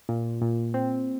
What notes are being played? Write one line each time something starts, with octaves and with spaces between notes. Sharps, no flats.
A#2
A#2
C4